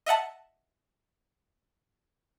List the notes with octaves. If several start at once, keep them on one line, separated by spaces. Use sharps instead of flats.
D#5 E5 F#5 A5